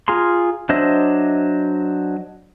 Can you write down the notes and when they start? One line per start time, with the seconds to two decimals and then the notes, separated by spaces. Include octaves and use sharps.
0.08 F4 G#4 A#5 C6
0.69 F#3 D4 C5 D#5 E5